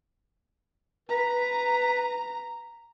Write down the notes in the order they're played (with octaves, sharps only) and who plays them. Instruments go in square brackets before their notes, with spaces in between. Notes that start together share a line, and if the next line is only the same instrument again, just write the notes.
[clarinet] B4 [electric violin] A#5